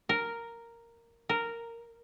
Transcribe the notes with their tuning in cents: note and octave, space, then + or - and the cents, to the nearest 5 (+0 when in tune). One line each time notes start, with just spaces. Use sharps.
A#4 -5
A#4 -10